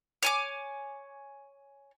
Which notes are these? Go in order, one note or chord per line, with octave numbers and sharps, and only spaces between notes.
C#5 G#5 D6